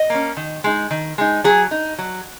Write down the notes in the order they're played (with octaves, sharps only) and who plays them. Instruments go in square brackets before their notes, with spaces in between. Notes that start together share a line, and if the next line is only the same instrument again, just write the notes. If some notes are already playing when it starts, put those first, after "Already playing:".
Already playing: [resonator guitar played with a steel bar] D#5
A#3 C#4
D#3
G#3 D#4
D#3
G#3 D#4
F#3 G#4
D#4
F#3